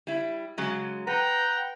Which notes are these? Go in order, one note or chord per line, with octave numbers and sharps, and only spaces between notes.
G3 E4
C#3 F#3 G#3
B4 F#5 G5 A#5